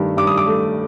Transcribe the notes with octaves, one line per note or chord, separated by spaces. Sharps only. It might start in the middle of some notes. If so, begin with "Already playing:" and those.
Already playing: G2 D#3 A3
G2 D6
D#6
D6
A3